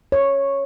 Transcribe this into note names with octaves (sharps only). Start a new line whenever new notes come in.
C#5